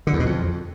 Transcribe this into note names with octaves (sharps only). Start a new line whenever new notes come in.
D3
E2
B2
F2